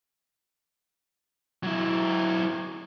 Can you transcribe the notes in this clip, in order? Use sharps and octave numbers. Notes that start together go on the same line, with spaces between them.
F#3 E4